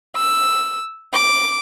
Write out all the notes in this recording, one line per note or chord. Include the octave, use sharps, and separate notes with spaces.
E6
D6